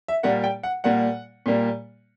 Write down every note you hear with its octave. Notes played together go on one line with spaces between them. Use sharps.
E5
A#2 G3 A#3 F#5
G5
F#5
A#2 G3 A#3 F#5
A#2 G3 A#3